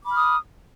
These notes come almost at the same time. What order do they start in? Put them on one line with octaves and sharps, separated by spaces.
D6 B5 F6 D#6